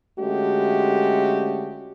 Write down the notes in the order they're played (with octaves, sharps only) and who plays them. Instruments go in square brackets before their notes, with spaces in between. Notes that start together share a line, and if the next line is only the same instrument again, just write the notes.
[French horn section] D3 G#3 A3 C#4 F#4 G4